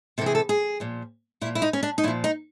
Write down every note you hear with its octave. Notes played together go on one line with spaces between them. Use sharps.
C3 E3 G#4 A4
A4
G#4
A#2 F3
A#2 F3 E4
E4
D#4
C#4
D4
D#4
A#2 F3 E4
D#4